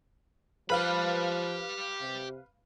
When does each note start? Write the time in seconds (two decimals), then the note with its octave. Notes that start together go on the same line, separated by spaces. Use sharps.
0.70 F3 G4 B4 F5 B5
2.01 C3